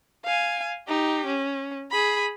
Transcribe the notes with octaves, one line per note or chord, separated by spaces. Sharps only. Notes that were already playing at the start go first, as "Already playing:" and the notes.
F5 G#5
D#4 G4
C#4
G#4 B5